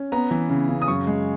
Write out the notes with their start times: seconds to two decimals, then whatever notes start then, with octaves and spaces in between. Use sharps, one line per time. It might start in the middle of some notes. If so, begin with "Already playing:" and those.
Already playing: C#4
0.12 B3 A#5
0.31 E3
0.50 C#3
0.69 C#3
0.82 D#6
0.88 F#2 C#6
1.07 G#3